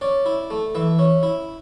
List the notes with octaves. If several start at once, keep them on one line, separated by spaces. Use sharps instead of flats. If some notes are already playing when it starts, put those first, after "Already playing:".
C#4 D5
E4
A3
E3 E5
C#4
E4